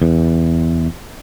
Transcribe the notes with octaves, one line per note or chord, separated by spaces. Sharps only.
E2